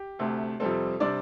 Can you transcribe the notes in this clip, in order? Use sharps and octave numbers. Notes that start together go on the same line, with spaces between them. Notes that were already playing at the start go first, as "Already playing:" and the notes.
Already playing: G4
D2 C3 A3
F2 C3 G3 C4 A4
C3 G3 C4 D4 D5